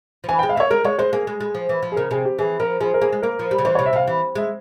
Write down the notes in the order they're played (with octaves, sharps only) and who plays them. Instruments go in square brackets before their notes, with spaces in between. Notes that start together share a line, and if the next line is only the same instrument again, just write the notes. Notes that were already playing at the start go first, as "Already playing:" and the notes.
[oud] F3
[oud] E3 [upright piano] G#5
[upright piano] G5
[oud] G#3
[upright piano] F5
[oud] A#3 [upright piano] C#5 E5
[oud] G#3 [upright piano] A#4
[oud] G#3 [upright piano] C#5
[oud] G#3 [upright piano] C5
[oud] A#3 [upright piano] G#4
[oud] G#3
G#3
F3
E3
F3
[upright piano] G#4
[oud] C#3 [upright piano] A#4
[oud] C3 [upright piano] G#4
[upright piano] G4
[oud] E3 [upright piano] G#4
[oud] F3 [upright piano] A#4
[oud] F3 [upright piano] G#4
[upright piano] A#4
[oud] A#3 [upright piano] G#4
[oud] G#3
[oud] A#3 [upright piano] A#4
[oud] F3
G3
C#3
[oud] E3 [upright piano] C5
[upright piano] C#5
[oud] C3
[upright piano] E5
[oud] C3 [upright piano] F5
[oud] E3
[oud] G#3 [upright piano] E5